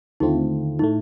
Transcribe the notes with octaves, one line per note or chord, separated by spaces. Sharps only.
D#2 D3 A3 C4 D#4 F4
D#4
A2 A3